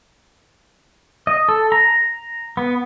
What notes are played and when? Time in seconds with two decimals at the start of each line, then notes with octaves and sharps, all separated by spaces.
1.27 D#5
1.49 A4
1.72 A#5
2.57 B3